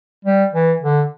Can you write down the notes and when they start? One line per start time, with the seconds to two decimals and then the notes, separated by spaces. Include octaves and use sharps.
0.25 G3
0.54 E3
0.82 D3